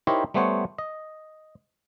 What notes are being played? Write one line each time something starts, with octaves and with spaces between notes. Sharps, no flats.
D#4 E4 G4 A#4 C5 C#5
G3 A3 B3 C5 C#5 F#5
D#5